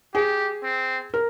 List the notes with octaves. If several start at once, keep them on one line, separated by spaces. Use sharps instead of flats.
G4 G#4
C4
A#4